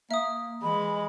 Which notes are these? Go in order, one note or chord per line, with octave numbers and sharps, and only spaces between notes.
A#3 E5 D#6
E3 G#3 B5